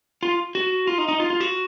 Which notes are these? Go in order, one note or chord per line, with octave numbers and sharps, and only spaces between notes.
F4
F#4
F4
D#4
D#4
F4
F4
F#4